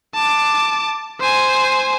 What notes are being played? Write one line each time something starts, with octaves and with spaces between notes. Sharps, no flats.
A5 D6
C5 G#5